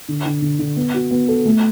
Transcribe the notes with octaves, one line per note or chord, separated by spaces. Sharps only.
D3
D3
D3
D3
B3
F#4
B3
A4
A3